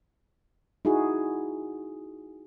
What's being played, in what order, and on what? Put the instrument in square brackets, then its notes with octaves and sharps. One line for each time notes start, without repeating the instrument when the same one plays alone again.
[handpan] D#4 E4 F#4 G#4